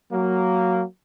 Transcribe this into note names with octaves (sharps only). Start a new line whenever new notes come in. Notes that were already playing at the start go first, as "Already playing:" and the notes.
F#3 A#3